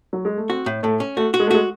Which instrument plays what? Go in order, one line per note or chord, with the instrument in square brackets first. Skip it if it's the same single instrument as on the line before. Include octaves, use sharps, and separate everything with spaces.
[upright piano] F#3
G#3
A3
[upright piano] C4 [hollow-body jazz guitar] F#4
[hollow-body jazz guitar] A2
[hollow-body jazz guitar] A2 [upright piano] A3
[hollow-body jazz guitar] C#4
[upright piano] A3 [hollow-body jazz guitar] F#4
[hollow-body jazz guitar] F#4
[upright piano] G#3
A3
[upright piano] G#3 [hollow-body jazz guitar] F#4